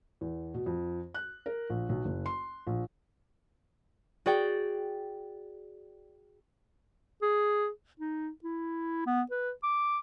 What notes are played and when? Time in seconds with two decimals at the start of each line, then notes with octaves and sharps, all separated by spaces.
0.21 E2
0.54 B2
0.66 F2
1.14 F#6
1.46 A#4
1.70 A#1
1.89 B1
2.05 F#1
2.26 C6
2.67 A#1
4.26 F#4 G#4 D5 G5
7.22 G#4
8.00 D#4
8.44 E4
9.07 B3
9.31 B4
9.63 D6